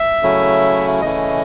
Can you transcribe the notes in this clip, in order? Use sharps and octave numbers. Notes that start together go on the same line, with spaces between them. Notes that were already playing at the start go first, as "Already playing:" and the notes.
Already playing: E5
C#3 F#3 A3 C#4 E4
C#3 E3 A3 C#4 E4 D#5